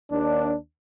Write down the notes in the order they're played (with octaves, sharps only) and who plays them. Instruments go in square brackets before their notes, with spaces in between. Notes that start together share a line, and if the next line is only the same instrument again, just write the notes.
[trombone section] D#2 D4